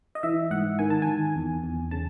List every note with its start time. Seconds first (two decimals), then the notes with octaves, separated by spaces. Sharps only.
0.15 D#5
0.23 E3 E5
0.51 G#2 F#5
0.79 D#3 G#5
0.90 A5
1.02 D#3 G#5
1.36 E2
1.64 E2
1.91 C#3 A5